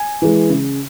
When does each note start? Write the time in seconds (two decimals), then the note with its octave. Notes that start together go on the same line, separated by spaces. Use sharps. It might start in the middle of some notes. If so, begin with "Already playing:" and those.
Already playing: G#5
0.22 E3 G#3
0.50 C#3